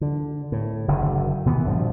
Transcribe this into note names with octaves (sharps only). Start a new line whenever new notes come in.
D3
A2
F#1 D3 D#3
B2 D#3 E3 B3
A#1 G2 B2 F3